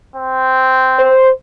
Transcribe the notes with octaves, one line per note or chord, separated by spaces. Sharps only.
C4
C5